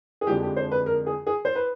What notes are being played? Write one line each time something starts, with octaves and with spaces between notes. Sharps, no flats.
G#4
F2 D3 F3 G#3 G4
G4
C5
B4
A#4
G#4
G#4
C5
B4